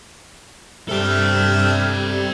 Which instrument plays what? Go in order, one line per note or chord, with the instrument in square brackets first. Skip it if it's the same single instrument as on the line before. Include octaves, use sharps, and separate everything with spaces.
[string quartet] G2 [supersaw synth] C3 G3 [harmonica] A3 E5 F6 [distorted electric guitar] A4 G5